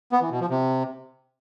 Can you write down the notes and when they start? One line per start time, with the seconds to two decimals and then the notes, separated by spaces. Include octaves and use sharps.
0.12 B3
0.22 E3
0.31 B2
0.40 F3
0.50 C3